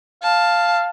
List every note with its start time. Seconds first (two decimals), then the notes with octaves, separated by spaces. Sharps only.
0.23 F5 A5